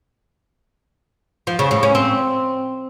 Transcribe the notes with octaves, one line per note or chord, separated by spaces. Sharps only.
F3
C#3
A2
C#4
C4